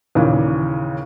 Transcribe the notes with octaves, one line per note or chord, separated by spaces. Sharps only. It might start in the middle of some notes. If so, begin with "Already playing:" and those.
D#2 A#2 C#3 E3